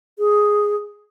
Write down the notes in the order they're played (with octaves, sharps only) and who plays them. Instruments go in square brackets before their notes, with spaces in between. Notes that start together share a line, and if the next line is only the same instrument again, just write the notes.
[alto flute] G#4